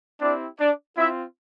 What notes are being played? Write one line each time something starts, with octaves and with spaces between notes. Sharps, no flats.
C4 D4 E4 G4 D5
D4 D5
C4 E4 F4 E5